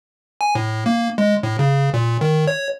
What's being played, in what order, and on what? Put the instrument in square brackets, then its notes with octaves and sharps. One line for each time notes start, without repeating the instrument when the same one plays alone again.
[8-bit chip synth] G#5
A2
A#3
G#3
A2
C#3
A#2
D#3
C#5